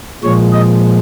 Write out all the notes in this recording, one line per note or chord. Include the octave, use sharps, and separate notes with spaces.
A#2 F3 G#3 C#5
D#5